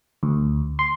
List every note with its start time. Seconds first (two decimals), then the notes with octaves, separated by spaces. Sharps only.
0.23 D2
0.79 C6